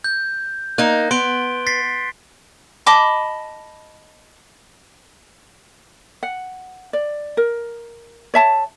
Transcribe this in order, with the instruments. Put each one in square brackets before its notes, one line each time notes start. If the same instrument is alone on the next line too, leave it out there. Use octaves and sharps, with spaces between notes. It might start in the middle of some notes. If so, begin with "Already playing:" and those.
[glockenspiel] G6
[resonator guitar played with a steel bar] A#3 D#4 [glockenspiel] F#6
[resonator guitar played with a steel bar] B3 [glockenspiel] C6 D7 G7
[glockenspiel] A6 B6 C7
[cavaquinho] D#5 A5 B5 D6
[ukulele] F#5
D5
A#4
C#5 E5 A5